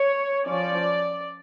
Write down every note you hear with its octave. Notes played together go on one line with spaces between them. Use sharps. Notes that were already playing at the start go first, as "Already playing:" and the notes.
Already playing: C#5
F3 C#4 D5